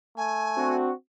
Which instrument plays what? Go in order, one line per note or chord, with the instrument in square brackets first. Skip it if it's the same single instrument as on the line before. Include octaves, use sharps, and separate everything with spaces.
[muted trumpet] A3 [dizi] G#5
[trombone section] C4 D4 F#4